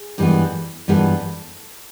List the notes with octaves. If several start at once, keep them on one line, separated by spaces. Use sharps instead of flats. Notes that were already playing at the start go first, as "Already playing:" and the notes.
Already playing: G#4
G2 E3 G#3 B3
G2 E3 G#3 B3 A4